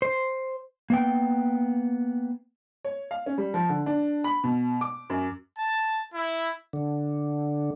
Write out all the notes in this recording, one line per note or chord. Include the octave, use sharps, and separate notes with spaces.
C5
A#3 B3 G5
C#5
F5
C#4
G3
F3
D3
D4
B5
B2
D6
F#2
A5
E4
D3